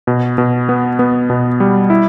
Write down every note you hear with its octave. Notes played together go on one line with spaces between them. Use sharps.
B2
B2
B3
B3
B2
G3
E4